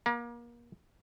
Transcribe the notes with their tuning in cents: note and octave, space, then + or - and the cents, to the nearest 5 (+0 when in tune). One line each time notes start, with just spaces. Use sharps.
A#3 +30 A#5 +40